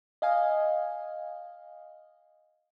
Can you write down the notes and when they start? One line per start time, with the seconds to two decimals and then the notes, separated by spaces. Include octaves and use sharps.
0.22 D#5 F5 G#5